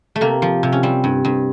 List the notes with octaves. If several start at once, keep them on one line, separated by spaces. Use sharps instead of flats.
A3
C3 A#3
F3
C3
C#4
G3 C4
G2
G2